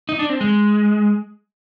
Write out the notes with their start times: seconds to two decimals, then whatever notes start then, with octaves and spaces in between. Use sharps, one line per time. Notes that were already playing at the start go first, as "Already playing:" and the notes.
0.09 D#4
0.19 D4
0.29 C4
0.41 G#3